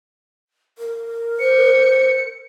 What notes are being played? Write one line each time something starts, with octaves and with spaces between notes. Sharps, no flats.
A#4
C5 C#7